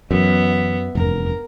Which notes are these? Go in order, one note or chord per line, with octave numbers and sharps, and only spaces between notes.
F#2 E3 F#3 B3 E5
F1 E2 G2 A#4